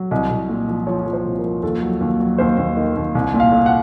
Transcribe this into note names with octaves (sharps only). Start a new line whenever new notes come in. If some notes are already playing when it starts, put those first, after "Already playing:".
Already playing: F#3
C2 D#5
C2
A#2
F3
F3 C#5
F3
C5
C2
A#4
F3
D#2 A4
F#3
D#2
F#3
D#2 C5
D#2
D#3
D#2
C2
A#2
F5
A#2
F#5